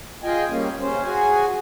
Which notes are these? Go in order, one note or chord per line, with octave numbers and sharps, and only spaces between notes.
F4 G#4 D#5 G5 G#5
G3 A#3 C#4
C#3 C#4 C5
F#4 G#4 G#5